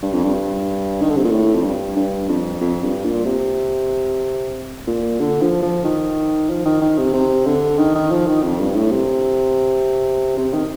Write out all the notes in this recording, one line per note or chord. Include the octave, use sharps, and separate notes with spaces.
G2
F2
G2
D#3
D3
C3
A#2
A2
F2
G2
G2
F2
F2
G2
A#2
C3
A#2
D3
F3
F3
D#3
F3
D#3
D#3
C3
C3
D3
D#3
D#3
F3
D#3
F2
G2
A2
C3
C3
D#3